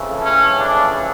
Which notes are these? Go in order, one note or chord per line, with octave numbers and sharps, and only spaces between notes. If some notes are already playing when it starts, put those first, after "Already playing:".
Already playing: F2 C#3 E3 A3
C#4
D4